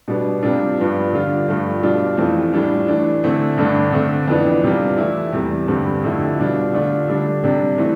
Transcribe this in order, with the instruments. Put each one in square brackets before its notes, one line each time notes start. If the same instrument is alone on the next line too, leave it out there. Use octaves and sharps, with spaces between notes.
[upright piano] B2 G3 B3 D4
C3 G3 D4 F4
G2 F3 B3 F4
D3 G3 D4 F4
G2 F3 A3
B2 G3 D4 F4
F2 E3 A3 C4 F4
A2 G3 D4 F4
E3 A3 D4
D3 A3 C4 E4
G2 D3 A3 D4
D3 A3 C4
F2 E3 B3 D4
C3 G3 D4 F4
E3 A3 E4
E2 C3 G3
G2 D3 G3 C4
F2 D3 A3 E4
B2 G3 D4 F4
D3 A3 D4 F4
D3 G3 D4
C3 G3 D4
E3 A3 C4